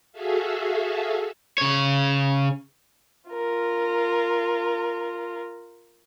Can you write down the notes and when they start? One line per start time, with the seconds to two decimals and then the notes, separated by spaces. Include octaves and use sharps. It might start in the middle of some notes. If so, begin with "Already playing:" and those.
0.12 F#4 G#4 A4 E5 F5
1.58 C#3 C#5
3.30 F4 A#4